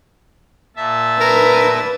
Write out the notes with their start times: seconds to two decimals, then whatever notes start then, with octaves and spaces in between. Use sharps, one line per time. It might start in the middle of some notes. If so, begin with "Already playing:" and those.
0.76 A#2 E5 A5
1.21 A#4 B4